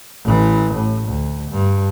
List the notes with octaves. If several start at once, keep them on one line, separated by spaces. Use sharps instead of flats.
A1 E3
A2
D2
G2